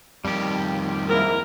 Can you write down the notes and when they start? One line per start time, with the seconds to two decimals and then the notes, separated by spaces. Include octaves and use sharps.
0.25 F2 D#3 G3 G4
1.09 G#2 A#3 E4 A#4